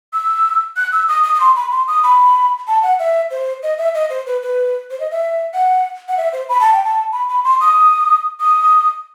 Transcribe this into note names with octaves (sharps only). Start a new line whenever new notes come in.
E6
F#6
E6
D#6
D#6
D#6
C6
B5
C6
D#6
B5
A5
F#5
E5
C5
D#5
E5
D#5
C5
B4
B4
C5
D#5
E5
F#5
F#5
E5
C5
B5
A5
G5
A5
B5
B5
C6
D#6
D#6